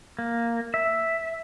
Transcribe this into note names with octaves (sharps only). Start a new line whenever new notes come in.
A#3
E5